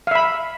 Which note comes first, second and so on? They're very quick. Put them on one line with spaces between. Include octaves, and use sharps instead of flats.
F5 E5 B5